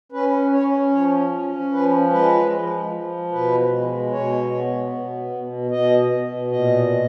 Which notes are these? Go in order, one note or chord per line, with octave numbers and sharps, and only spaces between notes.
C#4 B4
C#4 C#5
F3 C#5
C#4
F3 B4
G#3 B4
F3
F3
B2 B4
G#3
B2 C#5
B3
B2
B2
B2 D#5
B2
A#2 D#5
A#2